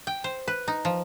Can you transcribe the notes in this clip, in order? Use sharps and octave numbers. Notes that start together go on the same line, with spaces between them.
G5
C5
B4
D#4
F3